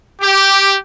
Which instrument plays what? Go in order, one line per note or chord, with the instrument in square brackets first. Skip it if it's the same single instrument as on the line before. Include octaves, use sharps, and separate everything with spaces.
[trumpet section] G4